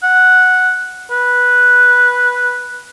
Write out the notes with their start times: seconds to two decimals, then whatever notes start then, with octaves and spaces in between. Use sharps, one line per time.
0.03 F#5
1.11 B4